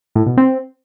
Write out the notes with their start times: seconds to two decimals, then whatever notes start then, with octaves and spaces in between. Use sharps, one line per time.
0.15 A2
0.26 B2
0.37 C4